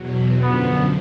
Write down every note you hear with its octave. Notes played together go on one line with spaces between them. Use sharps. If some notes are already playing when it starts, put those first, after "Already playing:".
Already playing: E2 B2 F#3
F#2 D3 F3 B3